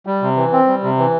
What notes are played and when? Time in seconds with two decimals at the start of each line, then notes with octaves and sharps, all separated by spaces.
0.06 G3
0.22 C3
0.37 E3
0.52 C4
0.67 G3
0.83 C3
0.99 E3